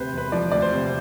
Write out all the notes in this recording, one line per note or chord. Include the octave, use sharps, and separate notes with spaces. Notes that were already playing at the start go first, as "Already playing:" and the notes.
Already playing: D2 C3 B4 C5
E1 B4
F3 D5
D2 D5
C5
C3